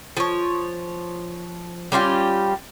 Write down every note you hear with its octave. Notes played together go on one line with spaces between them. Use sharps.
F3 C#5
G3 C#4 F4 G4